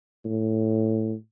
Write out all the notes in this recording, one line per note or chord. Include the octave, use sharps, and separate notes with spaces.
A2